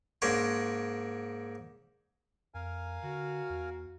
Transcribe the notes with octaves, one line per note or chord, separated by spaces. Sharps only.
G#2 A#3 C#4 D4 C#5 C6
F2 A#4 F5 G#5
D3 F#4
E2